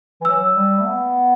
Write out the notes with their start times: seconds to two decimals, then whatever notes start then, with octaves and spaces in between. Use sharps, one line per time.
0.21 E3
0.24 F#3 E6
0.55 G3
0.79 A3
0.85 B3